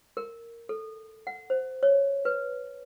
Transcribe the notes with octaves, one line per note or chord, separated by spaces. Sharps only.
A#4
A4
F#5
C5
C#5
B4